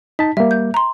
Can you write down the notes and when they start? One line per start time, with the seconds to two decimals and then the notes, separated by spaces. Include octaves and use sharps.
0.19 D#4 A5 B6
0.37 G3 A#3 E5
0.51 G6
0.74 A#5 C6